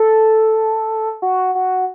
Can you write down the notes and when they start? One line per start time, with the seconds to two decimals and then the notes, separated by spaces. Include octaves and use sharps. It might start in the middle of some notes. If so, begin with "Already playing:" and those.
Already playing: A4
1.22 F#4
1.55 F#4